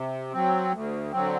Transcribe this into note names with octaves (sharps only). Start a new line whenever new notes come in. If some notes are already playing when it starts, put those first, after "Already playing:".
Already playing: C3
F#3 C4
D2
D3 F#3 C4